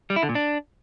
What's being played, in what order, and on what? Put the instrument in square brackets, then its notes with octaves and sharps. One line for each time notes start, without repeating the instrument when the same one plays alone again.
[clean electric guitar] G3
E4
D3
A#2
D4